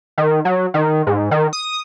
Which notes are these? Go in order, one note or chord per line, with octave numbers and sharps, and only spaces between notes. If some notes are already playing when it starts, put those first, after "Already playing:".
D#3
F#3
D#3
G#2
D#3
D#6